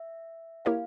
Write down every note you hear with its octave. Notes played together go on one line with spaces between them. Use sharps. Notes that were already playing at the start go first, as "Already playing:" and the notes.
Already playing: E5
A#3 E4 G4 A#4 C#5 F5